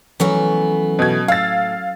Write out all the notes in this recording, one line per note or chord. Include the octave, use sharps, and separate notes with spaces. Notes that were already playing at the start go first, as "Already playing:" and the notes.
E3 F#3 A3 B3 C#4
B2 G#6
A2 F5 E6 A6